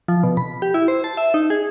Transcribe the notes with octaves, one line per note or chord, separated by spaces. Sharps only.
F3
B2
B5
G4
E4
C5
A5
E5
D#4
G#4